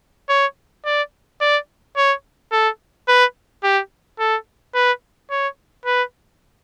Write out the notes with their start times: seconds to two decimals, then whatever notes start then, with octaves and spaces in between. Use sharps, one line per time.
0.29 C#5
0.85 D5
1.41 D5
1.97 C#5
2.52 A4
3.08 B4
3.63 G4
4.19 A4
4.75 B4
5.31 C#5
5.86 B4